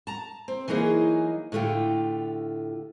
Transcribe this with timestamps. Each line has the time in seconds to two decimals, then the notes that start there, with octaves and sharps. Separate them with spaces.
0.07 A5 A#5
0.48 C4
0.68 E3 F#3 A#3 D#4 G#4
1.52 A2 D3 A3 F4 G4